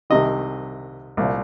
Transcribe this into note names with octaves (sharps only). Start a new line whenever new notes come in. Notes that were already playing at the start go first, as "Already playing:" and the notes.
C2 C3 D#3 D#5
C2 A#2